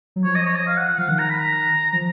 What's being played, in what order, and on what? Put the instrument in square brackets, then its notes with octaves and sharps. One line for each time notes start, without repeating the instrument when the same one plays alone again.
[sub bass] F#3
[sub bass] F3 [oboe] C#5
[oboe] D#5
C#5
D#5
F5
F#5
F#5
[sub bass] F3 [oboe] F5
[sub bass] D#3 [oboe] F#5
[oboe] A#5
B5
A#5
[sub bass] F3